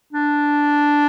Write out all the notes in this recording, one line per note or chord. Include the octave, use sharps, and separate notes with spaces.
D4